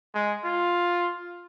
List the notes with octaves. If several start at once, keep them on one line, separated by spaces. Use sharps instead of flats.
G#3
F4